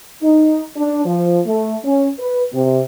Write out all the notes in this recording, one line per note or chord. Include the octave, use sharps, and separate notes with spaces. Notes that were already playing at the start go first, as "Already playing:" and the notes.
D#4
D4
F3
A3
C#4
B4
C3